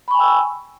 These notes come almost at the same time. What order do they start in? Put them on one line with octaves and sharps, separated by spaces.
B5 C#6 G#5 G5 E6